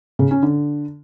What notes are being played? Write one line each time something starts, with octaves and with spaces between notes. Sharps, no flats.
C#3
C#4
D3